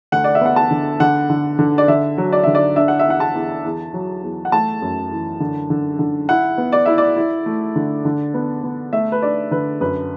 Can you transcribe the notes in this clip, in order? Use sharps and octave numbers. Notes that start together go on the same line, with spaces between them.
D2 F#5
D5
E5
B3 F#5
A5
D3
D3 F#5
D3
D3
D5
D3 E5
F#3
D5
D3 E5
D5
D4 E5
F#5
E5
E2 F#5
A5
E2
E2
F#3
E2
F#5
A3 A5
F#2
E3
D3
D3
D3
E4 F#5
B3
D5
E4 E5
D5
E4
A3
D3
D3
B3
B3
A3 E5
B4
D4 D5
D3 B4
F#2 B4